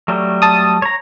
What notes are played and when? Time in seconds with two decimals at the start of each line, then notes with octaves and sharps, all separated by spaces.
0.08 F#3 G3 A3
0.42 A5 D#6
0.82 C#5 A#5